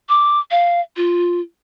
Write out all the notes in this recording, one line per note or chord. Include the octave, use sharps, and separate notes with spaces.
D6
F5
F4